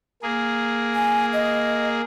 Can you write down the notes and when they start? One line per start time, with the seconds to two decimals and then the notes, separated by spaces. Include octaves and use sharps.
0.22 A#3 G#4
0.95 G#5
1.33 D#5